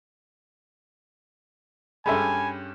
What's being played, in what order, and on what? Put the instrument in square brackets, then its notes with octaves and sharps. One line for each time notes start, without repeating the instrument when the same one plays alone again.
[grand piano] G2 C#4 G4 [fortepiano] G#3 A4 E5 [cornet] G#5 [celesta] B5